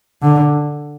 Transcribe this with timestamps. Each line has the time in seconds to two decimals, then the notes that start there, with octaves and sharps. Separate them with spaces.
0.22 D3